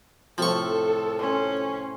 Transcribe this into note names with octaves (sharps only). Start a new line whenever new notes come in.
A2 C3 F3 A4 C#6
C#4 C5 C6